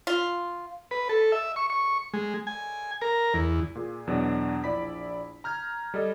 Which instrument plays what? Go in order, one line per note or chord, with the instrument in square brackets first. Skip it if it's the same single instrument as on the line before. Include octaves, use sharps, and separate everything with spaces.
[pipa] F4
[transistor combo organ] B4
A4
E5
C#6
C#6
G#3
G#5
A#4
E2
[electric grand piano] A#2 G#4
E2 B2 F#3 D4
A#1 E4 D5 B5 B6
A#5 F6 G6 G#6
G3 A4 D#5